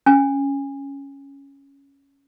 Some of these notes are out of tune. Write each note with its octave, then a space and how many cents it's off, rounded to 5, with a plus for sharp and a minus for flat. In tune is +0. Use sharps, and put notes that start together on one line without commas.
C#4 +0 G#5 -25